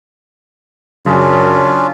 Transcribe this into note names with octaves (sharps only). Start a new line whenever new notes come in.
F#2 C#3 C#4 D4 F4